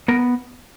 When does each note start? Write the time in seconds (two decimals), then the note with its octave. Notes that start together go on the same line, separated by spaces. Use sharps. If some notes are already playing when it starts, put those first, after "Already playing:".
0.08 B3 A#4